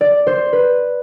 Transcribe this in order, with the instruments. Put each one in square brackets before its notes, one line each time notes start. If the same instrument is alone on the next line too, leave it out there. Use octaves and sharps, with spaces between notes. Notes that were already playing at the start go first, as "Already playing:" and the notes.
[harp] D5
C5
B4